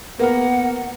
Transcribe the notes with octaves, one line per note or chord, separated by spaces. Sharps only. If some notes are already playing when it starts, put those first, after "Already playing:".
A#3 B3 A#4 F#5